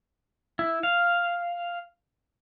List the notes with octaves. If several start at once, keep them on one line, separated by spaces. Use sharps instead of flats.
E4
F5